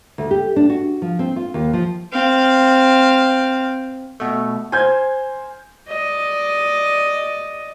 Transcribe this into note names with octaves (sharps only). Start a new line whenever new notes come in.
D2
G4
D4
F#4
F3
C4
F4
D#2
F3
C4 F5
B2 A3
C5 G#5 G6 G#6
D5 D#5